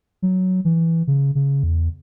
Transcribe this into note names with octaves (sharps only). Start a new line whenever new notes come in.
F#3
E3
C#3
C#3
E2